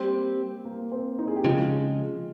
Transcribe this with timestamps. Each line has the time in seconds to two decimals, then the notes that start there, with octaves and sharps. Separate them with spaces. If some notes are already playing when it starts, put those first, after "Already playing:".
Already playing: G3 A#3 C4 G4 C5
0.65 A#3
0.92 C4
1.19 D#4
1.28 G#4
1.36 G4
1.45 C#3 F3 G#3 F4